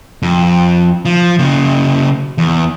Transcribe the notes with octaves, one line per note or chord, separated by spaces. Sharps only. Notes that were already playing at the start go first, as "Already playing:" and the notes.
F2
F3
C#3 A#3
E2